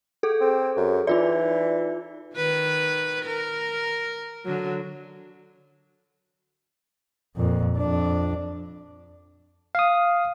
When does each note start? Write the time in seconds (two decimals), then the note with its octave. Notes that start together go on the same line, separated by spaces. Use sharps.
0.23 G#4 A4
0.41 C4
0.77 F#2
1.07 E3 D#4 F4 D5
2.35 D#3 B4
3.25 A#4
4.45 D3 F#3
7.36 F2 A#2
7.78 F2 D4
9.75 F5 D#6